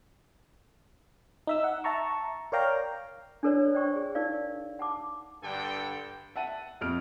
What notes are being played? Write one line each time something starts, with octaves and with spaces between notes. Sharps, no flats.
D#4 E5 E6
F#5
E5 A5 A#5 C#6
A#4 C#5 D5 F5 G5 A#5
D4 E4 A4 B4 C#5 D5
C5 D5 G5 C#6
G#4
D#4 A#4 D5 F5
F#5 A5 D6
G2 D3 A4 G5
E5 F#5 A5 D#7
F2 F6 D7